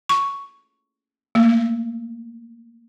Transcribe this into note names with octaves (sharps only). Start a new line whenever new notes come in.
C#6
A3 A#3